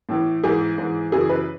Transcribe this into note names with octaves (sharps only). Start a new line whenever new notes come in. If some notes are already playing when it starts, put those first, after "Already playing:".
A2 E3
G#2 E3 G#4
G#2 E3
F#2 C#3 E3 G#4
B4